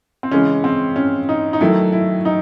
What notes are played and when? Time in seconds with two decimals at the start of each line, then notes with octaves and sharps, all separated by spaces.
0.23 C4
0.32 C#3 E3 G#3 C#4
0.64 C4
0.96 C#4
1.29 D#4
1.53 D#4
1.61 D#3 F#3 A3 E4
1.92 E4
2.25 D#4